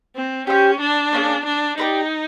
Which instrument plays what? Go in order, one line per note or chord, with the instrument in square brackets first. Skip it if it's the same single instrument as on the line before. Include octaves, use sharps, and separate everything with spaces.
[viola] C4
[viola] C#4 [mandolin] G4 C5 E5 G5
[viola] D4
[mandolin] A#3 C#4 F4 G#4
[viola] D4
[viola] D#4 [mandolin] G4 B4 D5